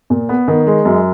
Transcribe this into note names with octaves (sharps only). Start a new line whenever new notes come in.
A#2
B3
D#3
G#3
F#2